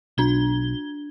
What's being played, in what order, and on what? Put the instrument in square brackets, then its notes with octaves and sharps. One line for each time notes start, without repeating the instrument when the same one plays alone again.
[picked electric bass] B1 [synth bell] D4 G#6 G7